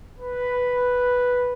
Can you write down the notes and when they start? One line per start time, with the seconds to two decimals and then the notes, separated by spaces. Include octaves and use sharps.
0.19 B4